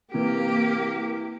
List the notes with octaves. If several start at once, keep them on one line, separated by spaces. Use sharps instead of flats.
C3 E3 A#3 G4